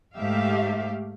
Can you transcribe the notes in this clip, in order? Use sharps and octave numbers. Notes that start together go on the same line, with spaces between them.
G#2 A3 G4 E5 F5